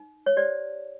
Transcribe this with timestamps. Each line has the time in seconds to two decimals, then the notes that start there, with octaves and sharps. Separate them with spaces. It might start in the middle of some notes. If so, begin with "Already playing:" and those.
Already playing: D#4
0.26 C#5
0.37 G4 C5 D5